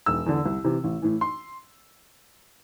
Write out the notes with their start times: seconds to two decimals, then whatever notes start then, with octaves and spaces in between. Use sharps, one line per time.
0.06 E1 E6
0.26 E2 D3
0.46 C2
0.64 C3 E3
0.84 A1
1.02 A2 E3
1.21 C6